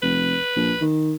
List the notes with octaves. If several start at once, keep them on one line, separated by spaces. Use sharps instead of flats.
F1 B4
A#1
D#3